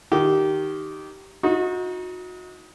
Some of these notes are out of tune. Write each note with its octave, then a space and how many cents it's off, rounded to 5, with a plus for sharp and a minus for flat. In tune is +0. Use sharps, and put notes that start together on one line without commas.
D#3 +0 G4 -15
D#4 +25 F#4 -30